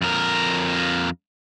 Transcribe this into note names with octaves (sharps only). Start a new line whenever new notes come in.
F2 A#4